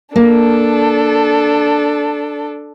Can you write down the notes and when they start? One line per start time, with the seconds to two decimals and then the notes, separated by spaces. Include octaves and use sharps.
0.16 A#3 D4 A4